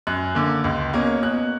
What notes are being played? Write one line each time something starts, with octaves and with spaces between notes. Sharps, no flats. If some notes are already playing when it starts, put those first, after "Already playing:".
F#2 F#6
D3 A#3
C#2
B2 A#3 C#4
B2 F#6